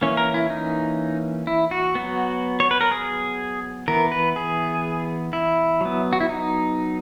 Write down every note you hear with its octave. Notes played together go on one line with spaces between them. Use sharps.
E3 A#3 C#4 C#5
A#4
E4
D#4
E4
F#4
F#3 B3
C#5
B4
A#4
G#4
E3 B3 A#4
B4
G#4
E4
F#3 B3
F#4
E4
D#4